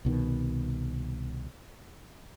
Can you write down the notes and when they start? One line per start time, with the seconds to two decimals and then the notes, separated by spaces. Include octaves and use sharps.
0.05 C2 B2 D#3